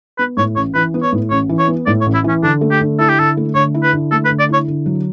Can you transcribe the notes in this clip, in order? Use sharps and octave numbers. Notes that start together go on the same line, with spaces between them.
B3 B4
A2 C#5
A1 C#5
E3 B4
B3
C#5
A2
A1 C#5
E3
C#5
B3
A2 D5
C#5
A1
E4
E3 C#4
D3 D4
A3
G4
D3
E4 A4
G4
D3 A4
A3
D3 C#5
E4
B4
D3
A3 A4
B4
D3
D5
E4 C#5
D3
F#3